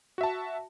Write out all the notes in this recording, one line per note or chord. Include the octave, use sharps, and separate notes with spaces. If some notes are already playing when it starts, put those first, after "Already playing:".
F#4 E5 A5